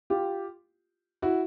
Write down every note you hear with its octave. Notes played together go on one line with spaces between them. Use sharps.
F4 G4
E4 F#4